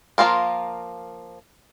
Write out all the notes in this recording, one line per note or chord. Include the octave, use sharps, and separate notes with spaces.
F3 A#3 F4 A#4